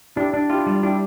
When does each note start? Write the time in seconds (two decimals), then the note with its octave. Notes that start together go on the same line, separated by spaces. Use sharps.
0.16 D4 E4 G4
0.34 D4
0.50 E4 F4 G4
0.66 G3
0.83 D4 E4 G4